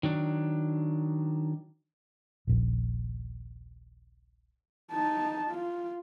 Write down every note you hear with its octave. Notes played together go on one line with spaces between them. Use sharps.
D#3 F#3 D4
D#1 A#1
D#4 A5
F4